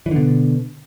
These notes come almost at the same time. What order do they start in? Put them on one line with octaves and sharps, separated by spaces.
E3 D3 B2